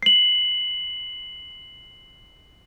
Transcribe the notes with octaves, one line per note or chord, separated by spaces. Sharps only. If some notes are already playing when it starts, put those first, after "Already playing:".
C7 F#7